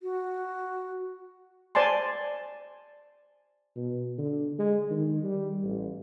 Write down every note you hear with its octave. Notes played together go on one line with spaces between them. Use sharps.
F#4
C5 D5 G#5 A5 C6
B2
D3
G#3
D#3
G3
A1